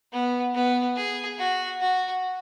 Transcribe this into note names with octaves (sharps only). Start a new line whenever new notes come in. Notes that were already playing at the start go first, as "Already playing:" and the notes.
B3
B3
G#4
F#4
F#4